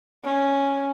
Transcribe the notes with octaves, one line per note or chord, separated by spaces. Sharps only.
C#4